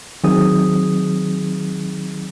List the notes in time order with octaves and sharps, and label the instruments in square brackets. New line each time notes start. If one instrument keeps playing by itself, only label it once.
[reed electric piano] D#3 F#3 C4 D#4 G#4 D#6